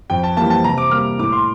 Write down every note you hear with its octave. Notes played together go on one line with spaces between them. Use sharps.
F2 G5
A5
E3 G3 A#3 A5
A5
C3 A#5
D6
G3 A#3 F6
A2 D6
C6